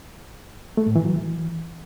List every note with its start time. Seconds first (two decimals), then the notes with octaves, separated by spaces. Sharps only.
0.77 A3
0.86 A2
0.96 E3
1.05 F#3
1.14 E3